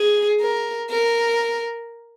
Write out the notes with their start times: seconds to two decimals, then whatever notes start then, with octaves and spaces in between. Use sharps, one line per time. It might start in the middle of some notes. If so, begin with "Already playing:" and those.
Already playing: G#4
0.40 A#4
0.90 A#4